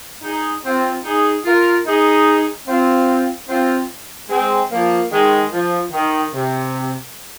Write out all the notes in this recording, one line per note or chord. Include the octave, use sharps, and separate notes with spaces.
D#4 G#4
C4 F4
D#4 G#4
F4 A#4
D#4 G#4
C4 F4
C4 F4
G#3 C4
F3 A#3
D#3 G#3
F3
D#3
C3